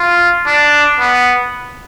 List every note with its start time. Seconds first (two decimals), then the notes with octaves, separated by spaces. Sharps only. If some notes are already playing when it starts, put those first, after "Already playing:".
Already playing: F4
0.47 D4
1.00 B3